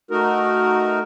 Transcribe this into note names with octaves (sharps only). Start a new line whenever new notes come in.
A3 D#4 F#4 A#4